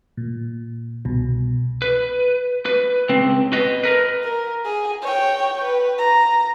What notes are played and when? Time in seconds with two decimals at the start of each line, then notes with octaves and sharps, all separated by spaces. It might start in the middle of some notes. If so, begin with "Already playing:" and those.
0.17 A#2
1.05 C2 B2
1.82 B4
2.66 B4
3.09 C#2 C4
3.53 B4 D#5
3.83 A#4 B4
4.23 A#4
4.65 G#4
5.02 C#5 G5
5.64 B4
5.98 A#5